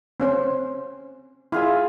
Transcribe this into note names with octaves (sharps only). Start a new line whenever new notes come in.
C4 C#4 C5
E4 F4 G#4 E5